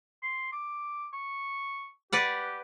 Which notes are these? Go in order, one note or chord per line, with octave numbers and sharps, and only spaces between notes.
C6
D6
C#6
G4 B4 D5 F#5